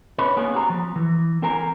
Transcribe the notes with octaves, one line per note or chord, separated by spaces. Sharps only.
C#4 B4
A#3 B3 C#4 G#4
C4 F#4 A#5
F3
E3
C4 A#4 G#5 A#5